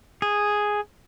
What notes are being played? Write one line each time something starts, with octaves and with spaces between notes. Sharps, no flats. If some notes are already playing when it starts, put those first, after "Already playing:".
G#4